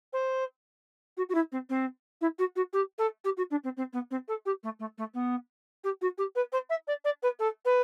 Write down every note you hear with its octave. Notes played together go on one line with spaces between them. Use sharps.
C5
F#4
F#4
E4
C4
C4
E4
F#4
F#4
G4
A4
G4
F#4
D4
C4
C4
B3
C4
A4
G4
A3
A3
A3
B3
G4
F#4
G4
B4
C5
E5
D5
D5
B4
A4
B4